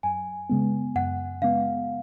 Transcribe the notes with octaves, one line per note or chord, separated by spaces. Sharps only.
F#2 G#5
C#3 G#3 B3
F#2 F#5
C#3 G#3 B3 F5